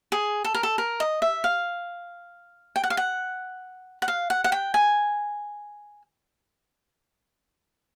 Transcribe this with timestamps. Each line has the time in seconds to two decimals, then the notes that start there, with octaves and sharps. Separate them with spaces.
0.12 G#4
0.44 A4
0.54 A#4
0.63 A4
0.78 A#4
1.00 D#5
1.22 E5
1.44 F5
2.76 G5
2.84 F#5
2.90 F5
2.97 F#5
4.02 F#5
4.08 F5
4.30 F#5
4.44 F#5
4.52 G5
4.74 G#5